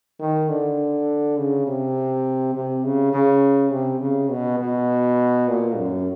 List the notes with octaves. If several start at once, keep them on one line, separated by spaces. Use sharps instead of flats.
D#3
D3
C#3
C3
C3
C#3
C#3
C3
C#3
B2
B2
A#2
F#2